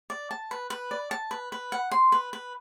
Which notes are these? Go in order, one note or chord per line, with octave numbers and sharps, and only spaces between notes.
D5
A5
B4
B4
D5
A5
B4
B4
F#5
C6
B4
B4